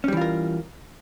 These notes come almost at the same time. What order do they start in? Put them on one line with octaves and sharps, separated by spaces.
C#4 G3 E3 F4 A#4